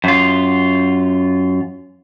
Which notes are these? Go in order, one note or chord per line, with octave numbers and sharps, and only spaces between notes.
F#2 F4